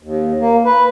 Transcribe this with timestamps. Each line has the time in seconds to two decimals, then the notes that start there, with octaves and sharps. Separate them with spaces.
0.03 D#2
0.40 A#3
0.65 B4